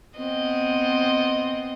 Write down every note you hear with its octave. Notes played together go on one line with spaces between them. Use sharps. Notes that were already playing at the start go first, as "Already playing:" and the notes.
B3 C4 D#5